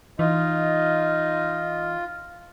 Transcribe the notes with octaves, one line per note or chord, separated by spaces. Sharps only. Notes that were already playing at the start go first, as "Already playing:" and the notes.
E3 D#4 F4 D#5